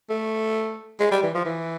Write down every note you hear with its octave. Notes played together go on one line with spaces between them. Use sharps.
A3
G#3
G3
E3
F3
E3